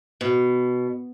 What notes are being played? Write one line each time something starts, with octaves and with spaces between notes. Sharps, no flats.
B2